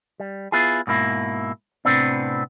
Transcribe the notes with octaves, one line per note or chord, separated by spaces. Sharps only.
G3
B3 E4 F4 G#4
G#2 B2 A#3 E4
A2 C3 F3 B3 C4 D4